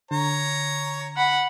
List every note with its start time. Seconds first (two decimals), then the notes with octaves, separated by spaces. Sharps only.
0.11 D3 C#5 A#5
1.17 F#5 B5